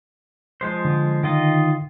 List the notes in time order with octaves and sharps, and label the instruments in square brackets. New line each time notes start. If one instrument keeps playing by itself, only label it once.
[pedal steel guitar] F3 G#3 C5
[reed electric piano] D3
[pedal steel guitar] D#3 F4 D#5